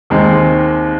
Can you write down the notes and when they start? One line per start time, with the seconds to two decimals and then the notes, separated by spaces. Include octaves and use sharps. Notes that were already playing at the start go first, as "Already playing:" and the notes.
0.10 D#2 D#3 G#3 C4